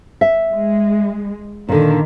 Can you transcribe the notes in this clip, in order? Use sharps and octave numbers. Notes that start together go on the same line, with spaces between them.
E5
G#3
A#2 D3 D#3